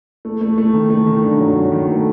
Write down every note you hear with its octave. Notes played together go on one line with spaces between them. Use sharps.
A3
A3
A3
D#3
A3
D#3
G2
F#3
F#3
D#3
A3